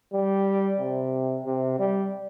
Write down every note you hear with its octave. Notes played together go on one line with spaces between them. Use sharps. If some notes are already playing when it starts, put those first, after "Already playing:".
G3
C3
C3
G3